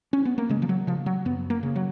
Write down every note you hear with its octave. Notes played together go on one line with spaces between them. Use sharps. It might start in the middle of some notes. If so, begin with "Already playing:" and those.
C#4
B3
A#3
C#3 G#3
F3
F#3
C#3 F3
F#3
F#2 B3
A#3
C#3
F#3